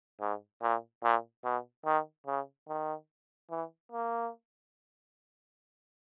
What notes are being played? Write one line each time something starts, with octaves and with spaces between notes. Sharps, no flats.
G#2
A#2
A#2
B2
D#3
C#3
D#3
E3
A#3